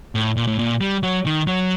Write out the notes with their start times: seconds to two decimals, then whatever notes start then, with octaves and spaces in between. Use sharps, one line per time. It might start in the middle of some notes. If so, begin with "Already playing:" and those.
0.15 A2
0.37 A#2
0.47 A2
0.59 A#2
0.81 G3
1.03 F#3
1.26 D#3
1.47 F#3